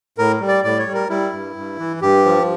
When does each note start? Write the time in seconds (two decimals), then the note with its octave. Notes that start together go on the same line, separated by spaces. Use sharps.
0.18 A2 A#4
0.40 G3
0.48 D5
0.64 A2 D5
0.79 C#5
0.86 G3
0.94 A#4
1.09 G3 E4
1.33 G2
1.56 G2
1.79 E3
2.01 G2 G4
2.25 F3